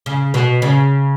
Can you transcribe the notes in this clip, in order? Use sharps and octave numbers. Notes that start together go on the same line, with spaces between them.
C#3
B2
C#3